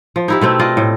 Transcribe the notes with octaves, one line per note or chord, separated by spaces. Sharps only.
F3
D#4 E4 G4
B2 A3 C4
F4 D5 D#5
A2